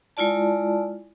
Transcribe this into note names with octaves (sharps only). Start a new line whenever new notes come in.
G#3 E4 F4 D5 A5